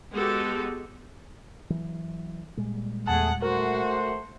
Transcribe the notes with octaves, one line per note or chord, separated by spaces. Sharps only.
G#3 B3 F#4 G4 A4
E3 F#3
A#2 G3 G#3
E2 A3 G#4 F#5 A5
A3 F#4 A#4 C5 F#5